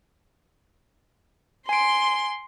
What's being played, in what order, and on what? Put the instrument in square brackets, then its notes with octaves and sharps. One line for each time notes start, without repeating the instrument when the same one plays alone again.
[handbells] G#5 D7 [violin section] C6